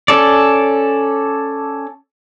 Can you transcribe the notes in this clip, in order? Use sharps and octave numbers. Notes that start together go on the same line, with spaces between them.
C#4 A4 D5